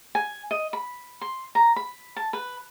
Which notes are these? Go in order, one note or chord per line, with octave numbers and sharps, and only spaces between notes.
G#5
D#5
B5
C6
A#5
B5
A5
B4